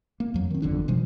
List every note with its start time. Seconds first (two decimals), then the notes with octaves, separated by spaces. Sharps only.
0.20 A#3
0.34 F2 F#3
0.50 D#3 C4
0.62 G1 F2 D3 D4
0.88 B2 E3 F3 G3